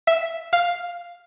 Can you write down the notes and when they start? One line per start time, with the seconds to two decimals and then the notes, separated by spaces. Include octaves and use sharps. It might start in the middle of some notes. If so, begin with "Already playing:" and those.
0.07 E5
0.53 F5